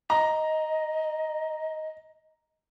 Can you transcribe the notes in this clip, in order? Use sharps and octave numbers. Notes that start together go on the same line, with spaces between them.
D#5 A#5